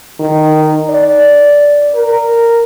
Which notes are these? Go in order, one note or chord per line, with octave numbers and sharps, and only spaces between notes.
D#3
D5
A#4